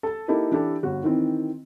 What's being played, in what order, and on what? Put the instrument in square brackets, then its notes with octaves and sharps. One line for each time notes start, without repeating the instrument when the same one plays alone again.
[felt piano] A4 A5
A#3 D#4 E4 G4 A4
E3 D4 E4 G4 A4
G1 F#4
D#3 E3 C4